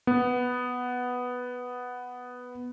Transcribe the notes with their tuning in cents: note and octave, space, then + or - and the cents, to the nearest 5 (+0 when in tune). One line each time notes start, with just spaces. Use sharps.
B3 +0